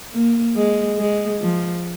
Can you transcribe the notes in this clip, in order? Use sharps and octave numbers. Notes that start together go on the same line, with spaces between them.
A#3
G#3
G#3
F3